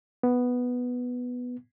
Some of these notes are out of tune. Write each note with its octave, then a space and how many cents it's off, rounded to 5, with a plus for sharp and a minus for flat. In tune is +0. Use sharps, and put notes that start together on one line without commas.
B3 +0